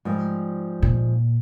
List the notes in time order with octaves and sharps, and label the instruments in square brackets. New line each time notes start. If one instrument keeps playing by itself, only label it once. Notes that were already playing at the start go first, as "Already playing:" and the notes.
[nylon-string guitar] G#2 F3 G3
[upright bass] A#2